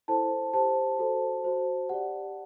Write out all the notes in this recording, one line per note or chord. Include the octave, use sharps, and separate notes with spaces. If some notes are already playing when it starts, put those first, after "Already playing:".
E4 A4 C5 A5
G4 C5 A5
F#4 A4 C5
F#4 C5
G4 D5 F#5